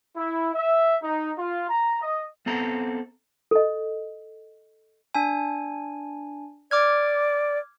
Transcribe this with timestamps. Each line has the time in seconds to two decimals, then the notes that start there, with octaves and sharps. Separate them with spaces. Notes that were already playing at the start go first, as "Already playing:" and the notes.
0.16 E4
0.54 E5
1.02 D#4
1.38 F4
1.69 A#5
2.02 D#5
2.46 B3 C4 A4 A#5
3.51 A4 D#5
5.15 D4 G#5
6.71 D5 D6 F6 G#6